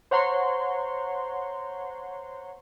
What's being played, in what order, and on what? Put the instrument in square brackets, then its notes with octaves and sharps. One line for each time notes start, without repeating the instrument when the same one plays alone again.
[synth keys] C5 C#5 F#5 A#5 C6 C#6